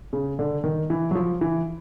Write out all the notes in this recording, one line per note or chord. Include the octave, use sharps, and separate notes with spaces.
C#3
D3
D#3
E3
F#3
F3
E3